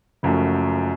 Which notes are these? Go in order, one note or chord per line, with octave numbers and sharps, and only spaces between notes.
F#1 F#2 F3 A3 F#4